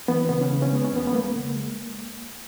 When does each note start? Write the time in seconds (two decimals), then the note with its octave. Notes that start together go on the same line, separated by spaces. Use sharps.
0.08 E3 B3
0.29 C#3 B3
0.41 C#4
0.50 C#3 B3
0.62 C#4
0.71 G#3 B3
0.84 C#4
0.92 E2 B3
1.07 B3
1.13 G#3 A#3
1.35 C#3
1.56 G#3